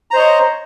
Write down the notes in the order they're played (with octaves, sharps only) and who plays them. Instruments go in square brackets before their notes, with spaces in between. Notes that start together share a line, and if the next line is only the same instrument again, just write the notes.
[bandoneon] A#5
C5
D#5
C#5